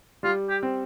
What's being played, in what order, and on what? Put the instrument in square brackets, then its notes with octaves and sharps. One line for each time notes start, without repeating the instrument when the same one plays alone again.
[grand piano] G3 [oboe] F4
[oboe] G4
[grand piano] C4